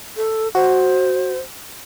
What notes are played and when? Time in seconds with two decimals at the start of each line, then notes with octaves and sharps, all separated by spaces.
0.17 A4
0.55 F#4 C5